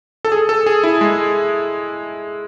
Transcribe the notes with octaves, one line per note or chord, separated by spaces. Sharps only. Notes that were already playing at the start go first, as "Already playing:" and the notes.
A4
G#4
A4
G#4
E4
G#3